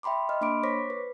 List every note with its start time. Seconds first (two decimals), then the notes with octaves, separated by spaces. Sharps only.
0.03 E5 G5 B5 C6 D6
0.29 D#5 F6
0.41 A#3 D4 B5 C6 D6 D7
0.63 C5 C#5 C#6 D6 A#6 B6
0.90 B4